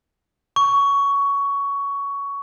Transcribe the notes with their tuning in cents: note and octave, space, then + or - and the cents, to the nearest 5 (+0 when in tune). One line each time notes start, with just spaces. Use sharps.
C#6 +15